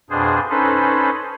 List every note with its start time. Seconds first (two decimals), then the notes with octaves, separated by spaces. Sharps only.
0.10 F2 B2 D4 G#4 C5
0.50 C#4 D#4 A4 B4 C5